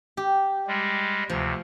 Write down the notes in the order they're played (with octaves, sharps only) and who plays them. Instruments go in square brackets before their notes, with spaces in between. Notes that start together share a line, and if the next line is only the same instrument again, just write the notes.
[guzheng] G4
[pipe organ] G3 G#3
[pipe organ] D2 C3 [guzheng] F3